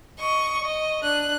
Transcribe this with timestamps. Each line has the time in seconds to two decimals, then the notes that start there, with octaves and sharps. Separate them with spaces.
0.19 D#5 C#6
0.63 D#5
1.03 D4 F#6